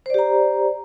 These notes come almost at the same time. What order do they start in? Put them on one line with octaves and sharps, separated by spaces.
C5 D5 G4 A#5